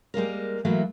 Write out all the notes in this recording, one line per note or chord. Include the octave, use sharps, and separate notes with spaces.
G3 G#3 A#3 A#4
E3 F#3 A3 A#3 E4 F#4